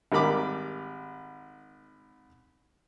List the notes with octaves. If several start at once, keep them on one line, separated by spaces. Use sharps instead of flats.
G#1 G3 A#4 B5 D6